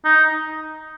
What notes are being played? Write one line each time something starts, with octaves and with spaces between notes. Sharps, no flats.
D#4